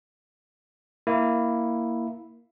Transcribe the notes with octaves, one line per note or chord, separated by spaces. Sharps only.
A#3 E4